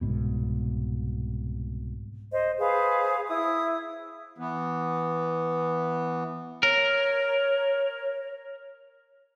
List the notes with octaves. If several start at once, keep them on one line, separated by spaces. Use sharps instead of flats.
C2 G#2 B2
C5 D#5
G#4 B4 C5 F5
E4 D#6
E3 B3
A#4 C#5